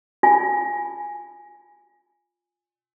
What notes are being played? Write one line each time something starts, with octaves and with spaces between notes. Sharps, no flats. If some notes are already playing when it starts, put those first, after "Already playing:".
F4 G#5